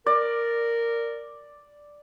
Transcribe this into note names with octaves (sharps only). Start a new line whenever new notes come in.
A#4 D5